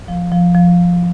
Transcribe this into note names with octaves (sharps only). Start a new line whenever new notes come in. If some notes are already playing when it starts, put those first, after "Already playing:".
F3
F3
F3